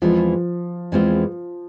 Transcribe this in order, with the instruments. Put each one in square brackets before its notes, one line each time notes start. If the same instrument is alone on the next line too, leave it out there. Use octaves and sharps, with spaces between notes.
[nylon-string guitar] E2 E3 G#3 C4 F4 [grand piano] F3
[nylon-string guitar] E2 E3 G#3 C4 F4